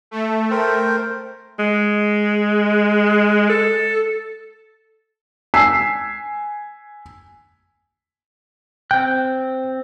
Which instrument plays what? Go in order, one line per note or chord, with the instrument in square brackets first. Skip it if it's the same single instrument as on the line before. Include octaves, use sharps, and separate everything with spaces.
[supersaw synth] A3
[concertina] A#4 C5 G5
[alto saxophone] G#3
A4
[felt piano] G#5 E6 B6 C7
[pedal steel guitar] C4 F#6 [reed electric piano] G5